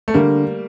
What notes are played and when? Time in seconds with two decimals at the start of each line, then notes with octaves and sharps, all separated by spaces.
0.08 A3
0.14 D3 G3 A#3